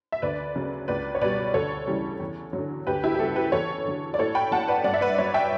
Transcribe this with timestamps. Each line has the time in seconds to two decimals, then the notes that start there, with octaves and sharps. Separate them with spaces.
0.12 E5
0.22 D2 B4 D5
0.55 C#3 F#3
0.88 C#2 B4 D5
1.15 C#5
1.21 B2 G3 B4 D5
1.54 D2 A4 C#5
1.87 C#3 E3 G3
2.20 E2
2.53 D3 F#3
2.87 D2 G4 B4
3.04 E4 G4
3.14 G4
3.19 C#3 G3 F#4 A4
3.36 G4 B4
3.52 E2 A4 C#5
3.85 D3 F#3
4.14 D5
4.19 A2 A4 C#5
4.35 G5 B5
4.51 F#3 F#5 A5
4.68 B4 D5
4.84 G2 D5 F#5
4.94 E5
5.01 B4 D5
5.14 D5
5.18 F#3 C#5 E5
5.34 E5 G5